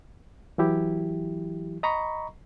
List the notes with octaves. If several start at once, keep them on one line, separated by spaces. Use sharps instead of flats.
E3 F#3 E4 G4
D#5 A#5 B5 C#6